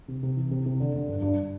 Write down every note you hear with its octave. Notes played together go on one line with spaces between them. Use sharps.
C3
C3
E3
C3
C3
D3
D3
G2
G2